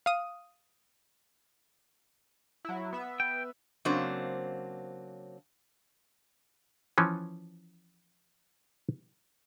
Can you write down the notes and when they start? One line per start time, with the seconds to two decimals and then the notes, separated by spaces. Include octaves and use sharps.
0.06 F5 D#6
2.65 F#3 E4
2.93 B3 E5
3.20 G5
3.85 C#3 F#3 A#3 C4 D4 C5
6.98 E3 F3 C#4